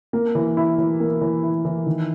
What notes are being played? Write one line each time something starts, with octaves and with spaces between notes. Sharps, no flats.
A#3
E3
E4
E3
A#3
E3
E4
E3
D#3